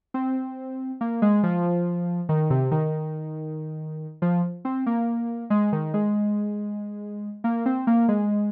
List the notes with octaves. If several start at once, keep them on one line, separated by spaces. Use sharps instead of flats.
C4
A#3
G#3
F3
D#3
C3
D#3
F3
C4
A#3
G#3
D#3
G#3
A#3
C4
A#3
G#3